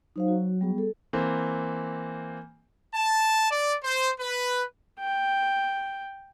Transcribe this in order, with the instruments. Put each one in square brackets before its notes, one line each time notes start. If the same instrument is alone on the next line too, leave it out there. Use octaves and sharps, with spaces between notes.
[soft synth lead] F#3 [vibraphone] D#4 C5 F5
[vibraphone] F#4
G3 B3 G#4
A4
[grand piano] E3 A#3 C4
[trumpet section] A5
D5
C5
B4
[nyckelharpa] G5